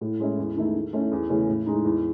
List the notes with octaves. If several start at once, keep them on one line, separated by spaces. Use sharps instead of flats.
A2
G#3 C#4 E4
E2
D#3 A3 E4
D#3
A3 C#4 E4
E2
C#3 E3 A3 C#4
A2
G#3 D#4
E2